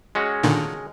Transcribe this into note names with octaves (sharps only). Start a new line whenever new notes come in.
G#3 C#4 F#4
A#2 D3 D#3